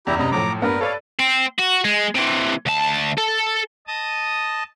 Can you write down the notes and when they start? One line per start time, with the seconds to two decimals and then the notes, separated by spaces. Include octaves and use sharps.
0.07 F#1 E2 E4 G4 A#5
0.19 F#2 C3 D#5 A#5 B5
0.32 A2 F3 F#3 A#5 D6
0.62 G2 A#3 B3 A#4 B4
0.81 A4 B4 C#5 D5 F5
1.20 C4
1.59 F#4
1.85 G#3
2.15 C3 E3
2.66 D2 A5
3.18 A4
3.87 D#5 A5 D#6